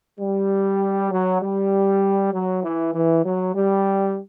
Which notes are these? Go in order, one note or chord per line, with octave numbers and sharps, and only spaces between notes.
G3
F#3
G3
F#3
E3
E3
F#3
G3